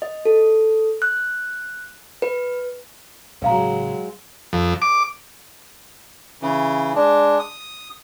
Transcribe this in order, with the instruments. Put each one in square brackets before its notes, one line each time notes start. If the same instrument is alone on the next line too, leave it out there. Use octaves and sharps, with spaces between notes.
[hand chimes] D#5
A4
F#6
B4
[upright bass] A1 C#3 [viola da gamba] F#3 G#3 [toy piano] B4 F5 A#5
[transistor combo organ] F2
D6
[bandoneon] C#3 E3
G#3 D4
D#6